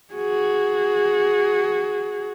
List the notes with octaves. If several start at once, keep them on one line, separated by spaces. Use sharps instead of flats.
F#4 G#4